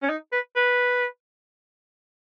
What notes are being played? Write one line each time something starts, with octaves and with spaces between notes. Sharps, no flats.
C#4
D#4
B4
B4